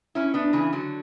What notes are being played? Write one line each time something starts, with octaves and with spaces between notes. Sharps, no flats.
C#4 E4
B3 D4
C#3 E3
D3 F#3